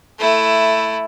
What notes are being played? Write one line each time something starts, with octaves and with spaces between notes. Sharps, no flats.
A3 E4